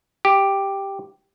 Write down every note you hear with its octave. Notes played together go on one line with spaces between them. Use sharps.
G4